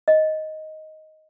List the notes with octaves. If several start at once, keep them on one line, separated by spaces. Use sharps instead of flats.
D#5